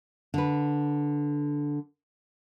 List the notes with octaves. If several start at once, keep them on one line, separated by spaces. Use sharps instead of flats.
D3 B4